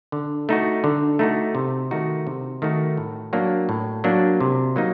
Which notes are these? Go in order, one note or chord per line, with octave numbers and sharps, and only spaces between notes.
D3
A3 D#4 F#4
D3
A3 D#4 F#4
C3
D#3 A3 D#4 F#4
C3
D#3 A3 D#4 F#4
A2
F#3 A#3 D4
A2
F#3 A#3 D4
C3
F#3 A#3 D#4